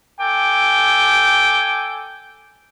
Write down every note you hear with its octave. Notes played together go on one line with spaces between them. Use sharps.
A4 G5 G#5 D6